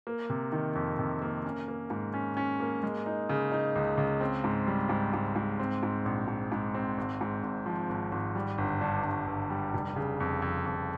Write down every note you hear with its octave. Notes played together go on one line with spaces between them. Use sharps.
A#3
C3
D#3
F2
C3
A#3
C#4
A#3
G#2
C#4
C#4
A#3
G#3
D#4
C#3
D#4
C#2
C#2
C4
G#2
G3
G#2
G#2
G#2
C4
G#2
A#1
G#2
G#2
C4
G#1
G#2
G#1
F3
G#1
G#1
G3
G1
G2
G2
G1
G3
F1
C#3
F2
F2
F2